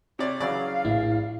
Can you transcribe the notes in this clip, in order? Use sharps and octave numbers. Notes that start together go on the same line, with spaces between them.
C3 C#5 D5
C#3 E3 F#3 D5 F5
A#1 A2 E4